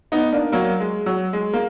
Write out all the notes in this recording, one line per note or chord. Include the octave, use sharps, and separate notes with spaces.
B3 D#4
A#3 D4
F#3 A#3
G#3
F#3
G#3
A#3